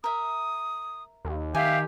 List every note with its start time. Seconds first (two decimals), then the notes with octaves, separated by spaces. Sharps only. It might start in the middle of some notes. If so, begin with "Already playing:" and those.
0.04 A#4 E5 D#6
1.25 D#2
1.55 D#3 G4 E5 F5 G5 G#5